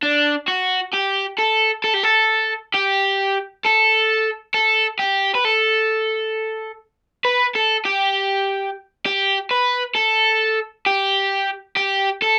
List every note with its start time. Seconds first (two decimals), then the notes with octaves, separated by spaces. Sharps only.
0.03 D4
0.48 F#4
0.93 G4
1.38 A4
1.84 A4
1.94 G4
2.03 A4
2.75 G4
3.65 A4
4.54 A4
4.99 G4
5.35 B4
5.45 A4
7.25 B4
7.55 A4
7.85 G4
9.06 G4
9.51 B4
9.96 A4
10.86 G4
11.77 G4
12.22 A4